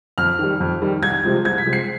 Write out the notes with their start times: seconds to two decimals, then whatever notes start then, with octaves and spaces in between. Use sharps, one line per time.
0.18 F2 F6
0.39 D#3 G3
0.60 F2
0.82 D#3 G3
1.02 C2 G#6
1.23 C3 F3 G#3 C4
1.45 C2 G#6
1.58 B6
1.66 C3 F3 G#3 C4
1.73 C7